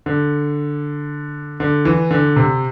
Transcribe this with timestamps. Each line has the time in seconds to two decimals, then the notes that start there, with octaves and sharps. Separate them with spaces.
0.06 D3
1.60 D3
1.85 E3
2.11 D3
2.36 C3